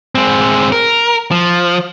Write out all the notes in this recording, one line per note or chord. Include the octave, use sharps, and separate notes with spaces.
G#3 C4
A#4
F3